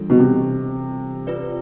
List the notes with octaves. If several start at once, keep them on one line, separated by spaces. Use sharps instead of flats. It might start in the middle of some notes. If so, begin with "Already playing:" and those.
Already playing: E3 G3 D4 F4 A4
B2
C3
C4 F4 B4 D5